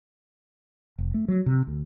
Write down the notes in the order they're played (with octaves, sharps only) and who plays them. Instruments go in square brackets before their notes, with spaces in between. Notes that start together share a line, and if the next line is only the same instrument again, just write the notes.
[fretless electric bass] F1
A3
F#3
C3
D2